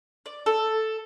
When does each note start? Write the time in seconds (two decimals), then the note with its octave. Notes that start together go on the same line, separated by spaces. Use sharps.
0.26 D5
0.46 A4